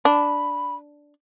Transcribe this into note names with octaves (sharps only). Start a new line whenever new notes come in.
D4 B5